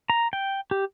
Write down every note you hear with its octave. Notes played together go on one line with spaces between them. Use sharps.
A#5
G5
G4